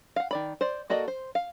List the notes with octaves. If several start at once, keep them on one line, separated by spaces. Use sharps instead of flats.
F5 F#5
D#3 D5 B5
C5 D5
A#3 F#4 A4 D5 D#5
C5
F5